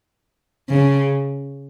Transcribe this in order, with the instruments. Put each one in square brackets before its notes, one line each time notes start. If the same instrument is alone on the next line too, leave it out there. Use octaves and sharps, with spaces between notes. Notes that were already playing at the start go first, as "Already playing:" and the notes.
[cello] C#3